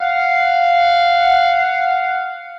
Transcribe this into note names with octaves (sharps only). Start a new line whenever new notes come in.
F5 F#5